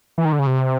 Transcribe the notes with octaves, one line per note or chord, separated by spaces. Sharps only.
E3
D#3
D3
C#3
C3